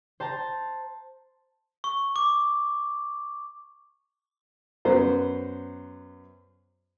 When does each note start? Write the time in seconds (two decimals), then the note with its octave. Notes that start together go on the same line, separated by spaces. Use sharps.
0.20 C5 A5 A#5
1.84 C#6
2.16 D6
4.85 F#2 B3 C5